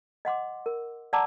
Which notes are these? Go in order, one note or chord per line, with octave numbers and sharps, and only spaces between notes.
D#5 F#5 C6 D6
A#4
D5 F#5 A5 A#5 D6 E6